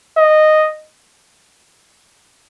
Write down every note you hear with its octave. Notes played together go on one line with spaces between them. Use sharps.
D#5